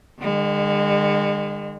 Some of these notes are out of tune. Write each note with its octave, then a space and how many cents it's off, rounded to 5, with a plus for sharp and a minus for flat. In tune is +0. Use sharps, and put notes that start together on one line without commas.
D3 +40 G#3 -35